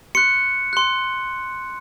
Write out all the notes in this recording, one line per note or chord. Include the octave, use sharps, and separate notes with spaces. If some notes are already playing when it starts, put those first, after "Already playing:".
C6 F#6 C#7
C6 F#6